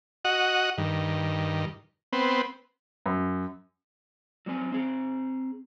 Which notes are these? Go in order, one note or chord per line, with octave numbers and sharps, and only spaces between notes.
F#4 D#5 F#5
G2 D#3
B3 C4
F#2
F#3 G3 C4 G#5
C4 G#4